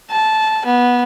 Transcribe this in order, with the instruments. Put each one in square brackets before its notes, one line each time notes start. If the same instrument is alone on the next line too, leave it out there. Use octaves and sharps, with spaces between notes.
[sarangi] A5
B3